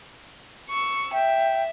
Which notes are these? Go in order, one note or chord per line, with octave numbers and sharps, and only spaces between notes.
C#6 E6
E5 G5